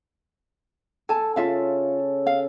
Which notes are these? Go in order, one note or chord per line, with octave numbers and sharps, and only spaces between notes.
A4 G#5 A5
C#3 F4 E5 F5
F5